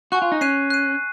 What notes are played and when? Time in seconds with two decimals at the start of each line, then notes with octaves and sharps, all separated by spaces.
0.12 F#4 G#5 C#6 F#6
0.22 F4
0.32 D#4
0.41 C#4 F#6 C7 D#7
0.70 F#6 C7 D#7